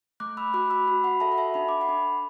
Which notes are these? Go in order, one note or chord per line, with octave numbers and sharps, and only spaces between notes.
A3 D6 F#6
B5 E6
F#4 D6 F#6
B5 E6
F#4
F#5 B5
A4 E5 A5
F#5
E5 A5
D4 B5
D6
F#5 B5
D4